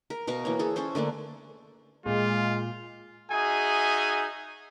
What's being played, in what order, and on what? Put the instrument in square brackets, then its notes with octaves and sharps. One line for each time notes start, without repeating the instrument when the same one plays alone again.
[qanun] A#4
B2 A#4 F5 C#6
E3 A#3 C#5
G#4 A4 C#5
C#4 A4 C5 C#5
D3 A3 A#3 D4
[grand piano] A#2 [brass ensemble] G#3 [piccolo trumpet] F4
[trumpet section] D#4 F#4 G#4 E5 G#5